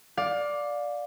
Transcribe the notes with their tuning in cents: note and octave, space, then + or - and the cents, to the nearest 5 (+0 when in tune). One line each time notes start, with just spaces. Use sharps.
D5 +0 F5 +25